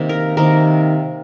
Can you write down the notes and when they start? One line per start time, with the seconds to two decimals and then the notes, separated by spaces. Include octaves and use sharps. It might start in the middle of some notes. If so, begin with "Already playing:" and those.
Already playing: C3 D#3 A#3
0.09 A#4
0.37 C3 D#3 A#3 A#4